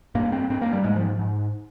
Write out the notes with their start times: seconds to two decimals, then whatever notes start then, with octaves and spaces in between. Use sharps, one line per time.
0.15 G2 A#3
0.32 C4
0.50 G2 C4
0.61 A#3
0.73 G3
0.84 G#2 G#3
0.96 F3
1.19 G#2